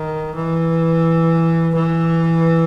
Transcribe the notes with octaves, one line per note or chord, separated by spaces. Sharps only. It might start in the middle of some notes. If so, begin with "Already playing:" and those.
Already playing: D#3
E3
E3